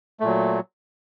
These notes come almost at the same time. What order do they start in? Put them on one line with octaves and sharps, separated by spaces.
A3 A#2 F#3